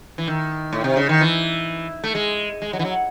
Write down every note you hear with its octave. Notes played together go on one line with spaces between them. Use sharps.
E3
D#3
A2
C3
C#3
D#3
E3
A3
G#3
G#3
F#3
E3
F#3